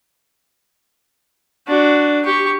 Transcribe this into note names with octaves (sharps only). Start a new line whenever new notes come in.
D4 F#4
G4 C#6